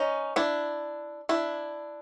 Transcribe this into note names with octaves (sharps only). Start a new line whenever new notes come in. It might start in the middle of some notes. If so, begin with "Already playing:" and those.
Already playing: C#4 D#4
D4 E4
D4 E4